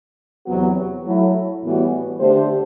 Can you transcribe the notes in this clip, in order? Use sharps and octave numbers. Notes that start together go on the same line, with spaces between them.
E2 C3 F#3 B3 F#4
F#3 A3 E4
A2 E3 G3 B3 F#4
D3 A3 D4 G4 C5